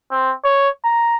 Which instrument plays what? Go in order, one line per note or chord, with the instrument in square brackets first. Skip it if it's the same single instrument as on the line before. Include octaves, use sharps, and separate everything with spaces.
[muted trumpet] C4
C#5
A#5